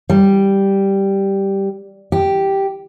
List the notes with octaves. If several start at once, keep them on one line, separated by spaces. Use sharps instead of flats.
G3
G4